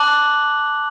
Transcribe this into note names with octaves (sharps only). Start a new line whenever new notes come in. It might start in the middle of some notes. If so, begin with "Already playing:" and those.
Already playing: A5 D6 F#6 F#7